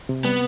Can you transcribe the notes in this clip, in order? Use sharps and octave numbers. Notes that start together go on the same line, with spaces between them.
C3
G3 B3